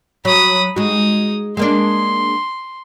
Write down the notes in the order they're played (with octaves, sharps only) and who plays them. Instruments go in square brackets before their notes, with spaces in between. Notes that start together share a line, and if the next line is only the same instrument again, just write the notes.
[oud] F#3 [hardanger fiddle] B5 D#6
[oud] G#3 F#4 [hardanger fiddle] D#4 D#6
[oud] G#3 A#3 D4 [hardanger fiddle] C6